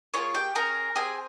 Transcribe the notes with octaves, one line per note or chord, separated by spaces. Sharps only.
A#3 C#4 F4 G#4 C#5
G4 G5
C#4 G#4 A#4 A#5
C4 G4 G#4 G#5